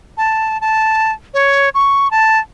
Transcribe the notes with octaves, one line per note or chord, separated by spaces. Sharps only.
A5
A5
C#5
C#6
A5